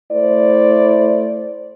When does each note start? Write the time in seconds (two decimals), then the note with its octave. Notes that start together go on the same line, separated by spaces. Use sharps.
0.11 A3 E4 C5 D5